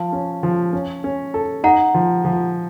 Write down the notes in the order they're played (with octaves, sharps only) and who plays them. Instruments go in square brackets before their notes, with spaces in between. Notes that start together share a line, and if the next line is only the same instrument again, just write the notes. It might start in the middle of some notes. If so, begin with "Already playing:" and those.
Already playing: [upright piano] F3 [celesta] F5 A5
[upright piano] C#4
F3
C#4
C#4
A4
[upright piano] D#4 [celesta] F#5 A#5
[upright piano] F3
F3